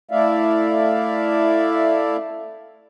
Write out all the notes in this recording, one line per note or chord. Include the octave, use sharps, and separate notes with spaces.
A3 E4 D5 E5 F5